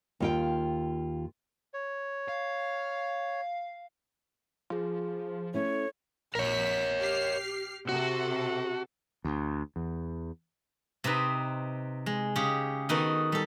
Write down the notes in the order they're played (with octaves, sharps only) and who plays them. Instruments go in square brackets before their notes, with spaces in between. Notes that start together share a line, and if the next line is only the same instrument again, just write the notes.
[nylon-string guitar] D#2 F4 G5
[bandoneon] C#5
[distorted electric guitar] F5
[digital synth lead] F3 [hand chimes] F4 G#4
[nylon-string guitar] A3 C#4 E4 [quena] C#5
[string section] A#1 B6 [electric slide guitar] A#4 C#5
[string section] G4 F6 C7
[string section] C3 A4 [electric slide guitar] F#4
[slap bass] D2
E2
[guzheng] C3 C4 D#4 B4
G#3
C#3 G4 G#4
D#3 B3 D#4 F#4 A4
G3 A4